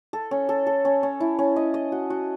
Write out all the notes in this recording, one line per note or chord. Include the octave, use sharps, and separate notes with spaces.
A4
C#4
A4
A4
C#4
C#4
E4
C#4
D#5
D#5
F#4
F#4